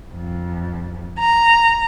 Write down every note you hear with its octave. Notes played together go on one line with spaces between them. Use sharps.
F2
A#5